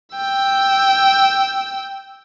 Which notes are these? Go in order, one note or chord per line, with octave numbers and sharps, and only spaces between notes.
G5 E6